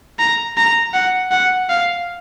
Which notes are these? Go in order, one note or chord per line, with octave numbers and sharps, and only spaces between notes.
A#5
A#5
F#5
F#5
F5